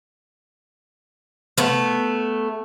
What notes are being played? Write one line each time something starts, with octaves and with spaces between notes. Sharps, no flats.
A3 B3